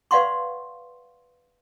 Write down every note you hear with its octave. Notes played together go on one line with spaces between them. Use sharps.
B4 D5 F5 F#5 C6 C#6